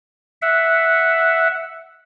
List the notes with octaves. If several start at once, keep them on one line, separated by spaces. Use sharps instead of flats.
E5 F#5